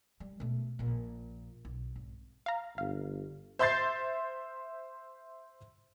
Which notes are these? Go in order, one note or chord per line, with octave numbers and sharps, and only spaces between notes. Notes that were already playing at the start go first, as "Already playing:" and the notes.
G3
B2 A3
A#1 A#2
B1
G#1
F5 A#5
G1 F5
C5 E5 C6 G6 A6 C7